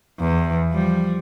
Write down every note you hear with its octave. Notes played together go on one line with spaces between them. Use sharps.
E2
F3 G3